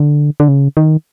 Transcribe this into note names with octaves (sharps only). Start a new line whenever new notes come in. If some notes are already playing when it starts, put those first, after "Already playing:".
Already playing: D3
D3
C#3
D#3